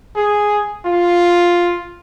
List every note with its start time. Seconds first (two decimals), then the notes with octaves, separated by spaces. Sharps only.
0.15 G#4
0.85 F4